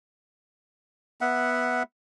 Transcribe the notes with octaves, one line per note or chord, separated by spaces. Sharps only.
B3 E5 F#5